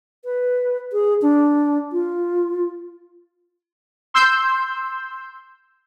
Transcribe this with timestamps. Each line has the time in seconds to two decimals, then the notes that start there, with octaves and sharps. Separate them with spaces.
0.25 B4
0.93 G#4
1.22 D4
1.92 F4
4.14 C6 E6 G6